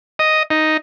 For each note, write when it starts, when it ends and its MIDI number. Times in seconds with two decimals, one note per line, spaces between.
0.19 0.43 75
0.50 0.77 63